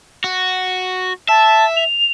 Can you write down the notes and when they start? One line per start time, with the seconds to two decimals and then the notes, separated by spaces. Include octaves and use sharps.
0.24 F#4
1.29 E5 A5
1.76 F7